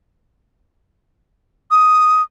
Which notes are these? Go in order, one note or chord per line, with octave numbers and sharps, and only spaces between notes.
D#6